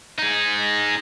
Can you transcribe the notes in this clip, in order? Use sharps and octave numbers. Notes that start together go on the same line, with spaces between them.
D#4 G#4